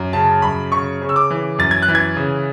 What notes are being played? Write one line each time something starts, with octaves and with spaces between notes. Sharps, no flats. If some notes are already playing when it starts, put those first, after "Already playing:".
Already playing: F#2
C#3 A5
F#2 B5
C#3 C#6
C#3
E6
D6
E3
F#2 A6
G#6
F#6
E3
G#6
C#3